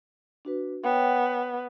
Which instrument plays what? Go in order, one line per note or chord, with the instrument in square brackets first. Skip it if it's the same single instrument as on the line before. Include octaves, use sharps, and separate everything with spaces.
[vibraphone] D4 F#4 B4
[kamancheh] B3 [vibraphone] C#5 F#5 G5